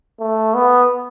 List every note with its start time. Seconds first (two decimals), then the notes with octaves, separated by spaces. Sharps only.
0.20 A3
0.54 B3